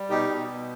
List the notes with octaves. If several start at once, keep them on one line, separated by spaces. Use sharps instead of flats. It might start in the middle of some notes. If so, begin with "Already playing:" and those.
Already playing: G3
B2 D#4 G4
B2